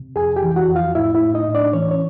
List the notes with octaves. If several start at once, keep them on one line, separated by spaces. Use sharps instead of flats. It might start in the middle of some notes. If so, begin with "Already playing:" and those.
Already playing: C3
F2 G#4 G#5
G4 G5
E3
F#4 F#5
F2
F4 F5
A2 E4 E5
E4 E5
A2
D#4 D#5
A2
D4 D5
E3 C#4 C#5
C#5